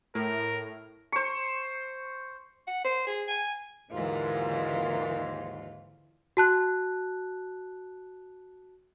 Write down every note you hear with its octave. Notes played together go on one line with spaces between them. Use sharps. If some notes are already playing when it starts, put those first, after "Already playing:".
A2 A#4
C5 C#6
F#5
C5
G#4
G#5
D#2 G#2 D3 E3 A#3 F4 F#4 A#4
F#4 A5 F#6